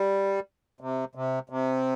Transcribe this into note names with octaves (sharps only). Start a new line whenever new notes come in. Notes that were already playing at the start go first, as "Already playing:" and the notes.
Already playing: G3
C3
C3
C3